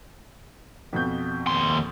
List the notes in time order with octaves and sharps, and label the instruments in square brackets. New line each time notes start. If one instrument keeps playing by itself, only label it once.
[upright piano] F2 B2 G6
[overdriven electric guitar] D#2 C6